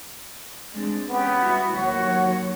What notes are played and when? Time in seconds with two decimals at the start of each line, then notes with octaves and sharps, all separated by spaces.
0.73 G#3 C4 D4
1.09 B3 C#4 G4
1.41 G3 E4 F#4
1.74 D#2 F#3 F#4 C#5